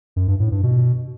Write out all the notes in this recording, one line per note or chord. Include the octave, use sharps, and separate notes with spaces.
F#2
G2
A2
G2
B2